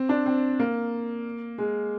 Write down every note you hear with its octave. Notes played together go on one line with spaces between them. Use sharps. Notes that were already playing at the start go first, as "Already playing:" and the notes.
Already playing: C4
D4
C4
A#3
G#3